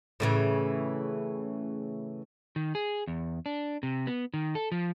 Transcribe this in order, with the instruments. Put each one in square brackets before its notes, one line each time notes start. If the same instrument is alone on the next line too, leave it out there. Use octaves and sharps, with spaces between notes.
[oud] A2 C#3 E3
[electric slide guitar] D#3
G#4
E2
D4
C3
B3
D#3
A4
F3